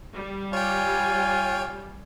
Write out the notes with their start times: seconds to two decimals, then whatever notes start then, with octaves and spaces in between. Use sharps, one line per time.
0.13 G3
0.53 F4 C#5 G5 G#5